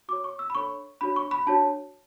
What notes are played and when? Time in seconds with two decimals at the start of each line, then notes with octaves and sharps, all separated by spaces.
0.09 F#4 D6
0.13 C#5
0.24 C#6
0.39 E6
0.50 B5
0.54 D4 A4 C#5 C#6
1.01 D4 F#4 C#5 B5
1.16 C#6
1.31 B5
1.47 D4 F#4 C#5 A5